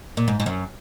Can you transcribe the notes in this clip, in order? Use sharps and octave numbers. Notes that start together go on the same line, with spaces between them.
A#2
G#2
G#2
F#2